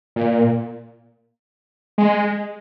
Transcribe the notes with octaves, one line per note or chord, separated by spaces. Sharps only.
A#2
G#3